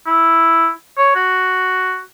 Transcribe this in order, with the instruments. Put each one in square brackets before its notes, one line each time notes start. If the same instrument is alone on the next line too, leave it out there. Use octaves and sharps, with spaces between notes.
[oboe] E4
C#5
F#4